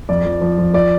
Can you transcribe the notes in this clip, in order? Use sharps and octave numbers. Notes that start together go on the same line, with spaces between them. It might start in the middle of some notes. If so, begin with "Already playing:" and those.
F2 D5
F3
F3
F3
F3 D5